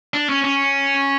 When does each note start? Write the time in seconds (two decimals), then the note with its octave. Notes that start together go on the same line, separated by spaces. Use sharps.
0.14 D4
0.29 C#4
0.44 C#4